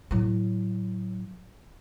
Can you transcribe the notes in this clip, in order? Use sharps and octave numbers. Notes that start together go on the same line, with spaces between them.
A2 F#3